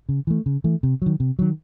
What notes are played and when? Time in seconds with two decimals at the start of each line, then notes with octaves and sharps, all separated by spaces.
0.09 C#3
0.27 E3 A3
0.46 C#3
0.64 E3 A3
0.83 C3
1.02 D#3 F#3
1.20 C3
1.39 D#3 F#3